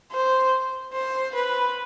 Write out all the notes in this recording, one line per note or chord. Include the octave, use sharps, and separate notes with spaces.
C5
C5
B4